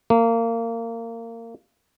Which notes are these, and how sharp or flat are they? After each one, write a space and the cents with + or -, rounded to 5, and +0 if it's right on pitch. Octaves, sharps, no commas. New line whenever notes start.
A#3 -25